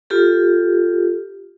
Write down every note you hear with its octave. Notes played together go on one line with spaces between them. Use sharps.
F4 G4 A4